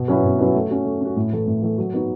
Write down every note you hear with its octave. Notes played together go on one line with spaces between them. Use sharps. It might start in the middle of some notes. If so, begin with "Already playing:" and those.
Already playing: B2
F#3 C#4 E4 B4
B2
F#3 C#4 E4 B4
A3
C#4 F#4
A3
C#4 F#4
A2
E3 A3
A2
E3 A3
F#3
B3 D#4 F#4